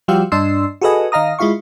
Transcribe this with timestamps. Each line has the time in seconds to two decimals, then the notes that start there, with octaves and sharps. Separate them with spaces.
0.08 F3 G3 F#4 F5 G5 E6
0.32 G2 D4 D#5 C6 E6 C7
0.81 F#4 G#4 A4 B4 D#5 G#5
1.12 D#3 D#5 F5 A#5 D#6
1.39 G#3 E4 F4 F5 C#6